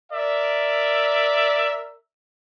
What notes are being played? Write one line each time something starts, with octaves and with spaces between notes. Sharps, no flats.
A#4 D5 E5